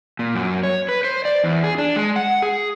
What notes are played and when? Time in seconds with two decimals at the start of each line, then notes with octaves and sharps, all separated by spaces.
0.19 A#2
0.35 F#2
0.63 C#5
0.89 B4
1.04 C5
1.25 D5
1.44 E2
1.64 G#4
1.78 D4
1.96 G#3
2.16 F#5
2.42 G#4